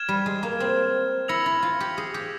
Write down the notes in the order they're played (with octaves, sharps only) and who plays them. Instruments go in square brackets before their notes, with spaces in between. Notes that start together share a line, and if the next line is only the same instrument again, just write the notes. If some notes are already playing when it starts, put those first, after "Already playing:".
Already playing: [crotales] F6 G#6 E7
[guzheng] G3
G#3
A#3
C4
[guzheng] E4 [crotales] E6 A#6 C#7 F7
[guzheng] E4
F4
G4
G#4
G4